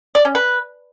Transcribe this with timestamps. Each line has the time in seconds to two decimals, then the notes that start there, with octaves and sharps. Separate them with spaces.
0.15 D5
0.25 C#4
0.35 B4